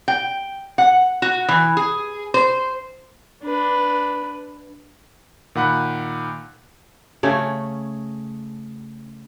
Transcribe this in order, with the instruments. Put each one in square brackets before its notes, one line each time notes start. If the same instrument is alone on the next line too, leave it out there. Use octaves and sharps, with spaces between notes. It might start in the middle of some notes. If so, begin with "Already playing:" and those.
[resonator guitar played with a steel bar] G5
F#5
F#4
E3
G#4
C5
[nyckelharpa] D4 B4
[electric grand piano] A#2 D#3 F#5 B5 F#6
[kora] C#3 A3 C#4